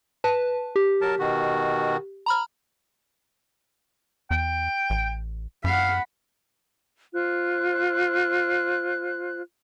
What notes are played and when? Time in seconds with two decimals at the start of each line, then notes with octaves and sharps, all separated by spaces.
0.24 B4 A5
0.76 G4
1.01 F#3 A#4 A5
1.19 B2 D#3 F#4
2.26 A#5 B5 F6
4.31 E2 G5
4.90 A1
5.64 F#2 F5 F#5 B5
7.13 F4 C5 F#6